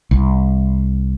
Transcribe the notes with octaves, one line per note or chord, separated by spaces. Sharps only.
C2